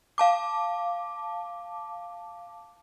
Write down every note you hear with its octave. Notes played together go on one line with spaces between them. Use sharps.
F5 A5 D6